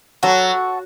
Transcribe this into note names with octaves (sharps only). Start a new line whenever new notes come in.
F#3 F#4 A4